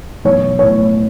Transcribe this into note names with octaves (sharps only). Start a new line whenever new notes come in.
B1 C#5
A2 C#5